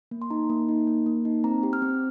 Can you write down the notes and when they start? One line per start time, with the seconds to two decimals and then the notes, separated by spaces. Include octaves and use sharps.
0.11 A#3
0.22 C6
0.30 D#4 A#5
0.50 A#3
0.69 D#4
0.87 A#3
1.06 A#3
1.25 D#4
1.44 C4 A#5
1.63 G4
1.73 F6
1.82 C4